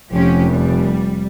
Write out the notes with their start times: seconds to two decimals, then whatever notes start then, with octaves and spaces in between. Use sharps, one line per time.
0.12 F1 F3 C#4 G4
0.51 G3